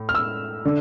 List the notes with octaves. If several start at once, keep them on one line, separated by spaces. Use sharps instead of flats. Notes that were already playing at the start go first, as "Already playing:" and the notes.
Already playing: A2
F6
E6
D3